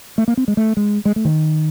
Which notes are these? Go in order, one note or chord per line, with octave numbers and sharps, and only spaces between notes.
A3
A#3
C4
G#3
A3
G#3
G#3
A3
D#3